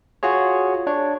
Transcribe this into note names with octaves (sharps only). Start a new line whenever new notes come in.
F4 F#4 G#4 C#5
D4 C#5